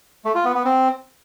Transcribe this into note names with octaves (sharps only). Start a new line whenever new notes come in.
A3
F4
B3
B3
C4